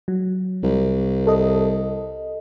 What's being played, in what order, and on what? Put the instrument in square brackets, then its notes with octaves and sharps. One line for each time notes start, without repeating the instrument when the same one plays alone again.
[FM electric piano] F#3
[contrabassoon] C2
[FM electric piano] A4 D#5